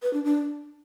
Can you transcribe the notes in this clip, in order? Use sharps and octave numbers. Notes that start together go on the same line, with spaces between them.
B4
D4
D4